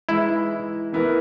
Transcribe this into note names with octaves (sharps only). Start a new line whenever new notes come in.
E3 G#3 D#4 E4
E3 B3 E4 A#4